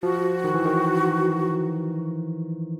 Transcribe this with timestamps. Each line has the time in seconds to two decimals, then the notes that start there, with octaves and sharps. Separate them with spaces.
0.03 F3 F#4
0.44 D#3
0.54 E3
0.65 D#3